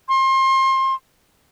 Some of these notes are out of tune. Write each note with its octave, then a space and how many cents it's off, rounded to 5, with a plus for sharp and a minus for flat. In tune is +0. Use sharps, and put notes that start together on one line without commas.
C6 +30